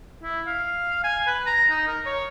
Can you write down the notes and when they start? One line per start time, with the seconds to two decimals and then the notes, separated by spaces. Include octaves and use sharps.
0.23 E4
0.47 F5
1.04 G#5
1.27 B4
1.46 A#5
1.70 D#4
1.87 A#4
2.06 C#5